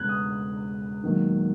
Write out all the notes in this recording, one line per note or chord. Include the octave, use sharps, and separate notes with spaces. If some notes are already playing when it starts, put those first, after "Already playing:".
Already playing: E1 E2 C#3 F#6 G#6
D#6
E1 E2 D#3 F#3 A#3